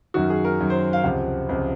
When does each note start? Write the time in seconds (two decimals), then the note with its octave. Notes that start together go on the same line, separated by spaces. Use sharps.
0.14 F#2 D#3 F#4
0.30 G#4
0.45 A#4
0.59 F#2 D#3
0.70 C5
0.93 F5
1.04 C#2 C3 F3 F#5
1.49 C#2 C3 F3